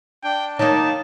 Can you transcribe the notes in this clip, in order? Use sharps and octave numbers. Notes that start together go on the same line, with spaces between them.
D4 G5
D#3 A#3 D#4 C#5 A5